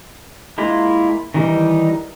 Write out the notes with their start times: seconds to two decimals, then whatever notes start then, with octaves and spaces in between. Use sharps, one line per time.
0.58 G#3 A#3 E4 F4
1.34 D#3 E3 G3 D#4